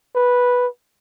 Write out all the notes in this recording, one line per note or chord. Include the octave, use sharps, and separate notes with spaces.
B4